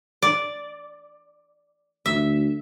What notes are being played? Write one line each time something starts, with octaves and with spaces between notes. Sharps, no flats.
D5
D2 E5